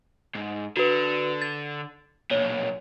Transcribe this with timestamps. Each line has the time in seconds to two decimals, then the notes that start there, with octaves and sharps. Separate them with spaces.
0.35 G#2
0.77 D3 F#4 B4
1.42 A6
2.31 B1 A#2 C#5